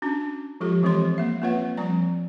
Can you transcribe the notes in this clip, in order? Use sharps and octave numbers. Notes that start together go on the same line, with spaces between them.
C#4 D4 F#4 A5
F3 G#3 F4 G4 A4
E3 G#3 C4 G4 C#5 C6
A#3 E5
A#3 C4 F4 B4 C#5 F#5
F3 G3 C4 D5 A#5